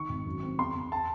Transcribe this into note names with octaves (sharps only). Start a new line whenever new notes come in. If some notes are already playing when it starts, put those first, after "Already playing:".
Already playing: D#3 C#6
G#1
F#2
C4
E2 C6
E2
A5